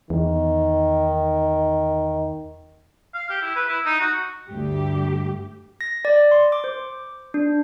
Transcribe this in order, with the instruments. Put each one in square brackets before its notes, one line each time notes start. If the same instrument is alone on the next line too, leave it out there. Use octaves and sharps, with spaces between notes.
[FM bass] E2 [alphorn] D#3
[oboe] F5
G4
E4
B4
E4
D#4
F#4
[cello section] D2 G2 G4
[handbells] A#6
D5
C6
D6
C5
D4